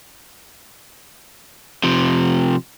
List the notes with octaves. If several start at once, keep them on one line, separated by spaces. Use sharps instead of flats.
C3 F3